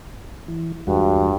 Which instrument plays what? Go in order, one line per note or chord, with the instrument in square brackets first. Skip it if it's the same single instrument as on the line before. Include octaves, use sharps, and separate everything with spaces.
[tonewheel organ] E3
[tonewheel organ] E2 G#3 F#4 [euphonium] G2